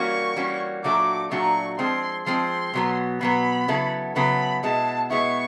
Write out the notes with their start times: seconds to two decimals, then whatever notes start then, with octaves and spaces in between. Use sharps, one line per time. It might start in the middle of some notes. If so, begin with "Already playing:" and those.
Already playing: E3 G3 A#3 C#4 F#4 C#6
0.36 E3 G3 A#3 C#4 F#4
0.84 A#2 F#3 A3 D4 F#4 D6
1.31 A#2 F#3 A3 D4 F#4 C#6
1.79 F3 G#3 C4 C6
2.26 F3 G#3 C4 C6
2.74 B2 F#3 B3
3.21 B2 F#3 B3 B5
3.68 C#3 F#3 B3 E4 A4
4.16 C#3 F#3 B3 E4 A4 B5
4.63 B2 G#3 B3 E4 A5
5.10 B2 G#3 B3 E4 C#6